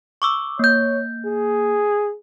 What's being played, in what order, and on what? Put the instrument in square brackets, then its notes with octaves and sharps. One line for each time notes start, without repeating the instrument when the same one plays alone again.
[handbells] C#6 D6 E6
[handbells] A#3 G6 [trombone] C#5
[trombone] G#4